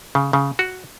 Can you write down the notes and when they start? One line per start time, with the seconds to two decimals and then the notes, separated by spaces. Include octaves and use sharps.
0.15 C#3
0.33 C#3
0.59 F#4